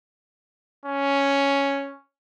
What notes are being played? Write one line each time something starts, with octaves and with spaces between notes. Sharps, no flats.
C#4